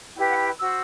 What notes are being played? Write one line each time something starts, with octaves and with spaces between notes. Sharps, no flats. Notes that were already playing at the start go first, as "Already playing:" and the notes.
E4 G4 B4 G5
F#5
G5
F#4 C5 E6